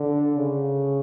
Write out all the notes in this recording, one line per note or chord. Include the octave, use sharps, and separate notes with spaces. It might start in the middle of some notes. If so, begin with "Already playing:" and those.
Already playing: D3
C#3